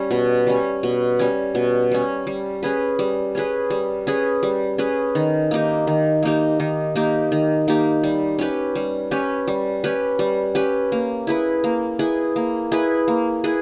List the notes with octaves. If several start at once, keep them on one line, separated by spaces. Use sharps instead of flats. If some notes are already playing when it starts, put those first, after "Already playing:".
Already playing: G3 C#4
B2
G3 C#4
B2
G3 C#4
B2
G3 C#4
G3
C#4 G#4 B4
G3
C#4 G#4 B4
G3
C#4 G#4 B4
G3
C#4 G#4 B4
D#3
A#3 D#4 G4
D#3
A#3 D#4 G4
D#3
A#3 D#4 G4
D#3
A#3 D#4 G4
G3
C#4 G4 B4
G3
C#4 G4 B4
G3
C#4 G4 B4
G3
C#4 G4 B4
A#3
E4 G#4 B4
A#3
E4 G#4 B4
A#3
E4 G#4 B4
A#3
E4 G#4 B4